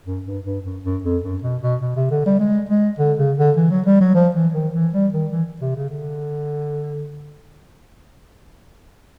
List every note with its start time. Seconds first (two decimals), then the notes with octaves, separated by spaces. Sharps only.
0.06 F#2
0.26 G2
0.45 G2
0.65 F#2
0.84 F#2
1.04 F2
1.23 F#2
1.43 B2
1.62 B2
1.82 B2
1.96 C3
2.11 D3
2.26 G3
2.40 G#3
2.69 G#3
2.99 D3
3.18 C#3
3.38 D3
3.57 E3
3.71 F#3
3.86 G3
4.01 F#3
4.15 F3
4.35 E3
4.54 D#3
4.74 E3
4.93 G3
5.13 D#3
5.32 E3
5.62 C3
5.76 C#3
5.90 D3